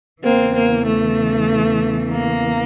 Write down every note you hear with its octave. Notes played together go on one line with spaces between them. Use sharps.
E2 C#3 E3 A#3 C4
A#3
A3
A#3